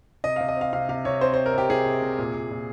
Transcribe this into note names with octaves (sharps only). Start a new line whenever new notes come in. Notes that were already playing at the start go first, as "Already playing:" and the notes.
C3 D#5
C3 F5
D#5
C4 F5
C3 F5
C3 F5
C3 C#5
C4 C5
C4 C5
A#4
C3 G4
C3 G#4
C3
C3
A#2
A#2
A#2